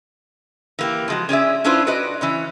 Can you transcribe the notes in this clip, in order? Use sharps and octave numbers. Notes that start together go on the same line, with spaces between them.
E3 A#3 G4
F3 G#3 F#4
C#4 G#4 D5 E5
C#4 D4 E4 F4 B4 C5
F#4 B4 D5 D#5
E3 C#4 C#5